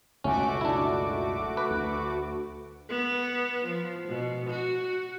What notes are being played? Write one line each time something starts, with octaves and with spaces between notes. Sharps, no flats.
F#1 C#2 B2 A3 C#4 F#4 D6
D4 E4
B4
D2
B3
F3
B2
F#4